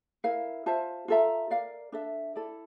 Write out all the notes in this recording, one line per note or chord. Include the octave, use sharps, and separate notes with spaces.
E4 A#4 F5
F4 C5 E5 A5
F4 A4 E5 A#5
A#4 D5 F5
D4 A4 E5
E4 A4 D5